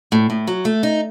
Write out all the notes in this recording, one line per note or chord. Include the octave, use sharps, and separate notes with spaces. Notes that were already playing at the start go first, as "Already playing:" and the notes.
A2
A2
F#3
A3
D#4